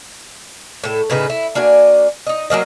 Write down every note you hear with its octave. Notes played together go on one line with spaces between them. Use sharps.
A2 A4
A2 C#3 D#4 B4
E4
A#3 D4 F#4 G#5
D#4 D#5
F#3 G#3 A#3 D#5